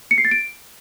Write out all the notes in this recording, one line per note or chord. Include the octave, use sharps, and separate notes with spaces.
C#7
C7
A6
D7